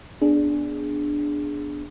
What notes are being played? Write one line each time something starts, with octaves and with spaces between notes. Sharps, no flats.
B3 D4 G#4